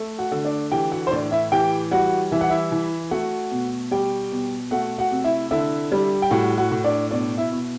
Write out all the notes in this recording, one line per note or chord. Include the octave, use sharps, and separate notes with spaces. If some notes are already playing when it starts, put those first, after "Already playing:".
Already playing: A3
F#4 F#5
D3
D4 D5
E3 G4 G5
F#4 F#5
C5
A2 D4 D5
E4 E5
E3 G4 G5
G3 F#4 F#5
E3 E5
F#5
E4 E5
E3
A3 F#4 F#5
B2
G3 G4 G5
B2
A3 F#4 F#5
F#4 F#5
C3
E4 E5
D3 E4 E5
G3
G5
A2 F#4 F#5
F#4 F#5
A2
D4 D5
B2 D4 D5
E4 E5
B2